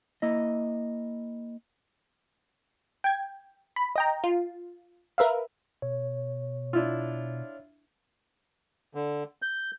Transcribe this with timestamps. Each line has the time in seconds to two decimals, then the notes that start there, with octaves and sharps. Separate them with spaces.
0.22 A#3 E4 D#5
3.04 G5 G#6
3.76 B5
3.96 D#5 G5 A#5
4.24 F4
5.18 A#4 B4 E5 F5
5.82 B2 C#5
6.73 D4 E4 F4
8.95 D3
9.42 G6